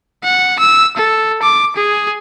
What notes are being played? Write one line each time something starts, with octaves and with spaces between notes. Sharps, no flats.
F#5
E6
A4
D6
G#4